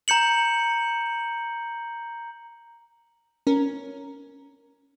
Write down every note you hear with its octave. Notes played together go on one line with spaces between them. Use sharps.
A#5 G6 C#7 F#7
C#4 A#4